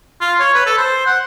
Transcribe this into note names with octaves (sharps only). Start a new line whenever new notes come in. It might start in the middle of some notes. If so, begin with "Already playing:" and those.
F4
C#5
B4
A4
C5
F#5